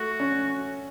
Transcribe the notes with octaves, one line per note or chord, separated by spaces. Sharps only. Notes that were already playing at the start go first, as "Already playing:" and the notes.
Already playing: A3 F#4
C#4